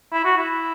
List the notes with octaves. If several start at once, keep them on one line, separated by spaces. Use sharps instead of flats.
E4
F#4
E4